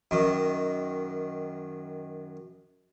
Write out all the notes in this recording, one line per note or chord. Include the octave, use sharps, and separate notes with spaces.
F#2 D#3